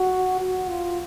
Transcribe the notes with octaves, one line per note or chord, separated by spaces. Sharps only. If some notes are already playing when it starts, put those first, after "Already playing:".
Already playing: F#4
F#4
F4